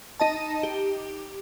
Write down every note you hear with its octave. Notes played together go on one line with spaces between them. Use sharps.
D#4 D#5 A5
G4